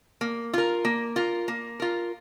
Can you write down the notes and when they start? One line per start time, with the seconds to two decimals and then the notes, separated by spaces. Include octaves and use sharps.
0.21 A#3
0.54 F4 A#4
0.85 A#3
1.16 F4 A#4
1.48 A#3
1.80 F4 A#4